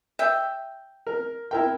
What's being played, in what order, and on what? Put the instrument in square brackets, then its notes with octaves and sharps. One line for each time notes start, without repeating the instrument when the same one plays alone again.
[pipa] E5 G5
[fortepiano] A#4
E4 A#4 G5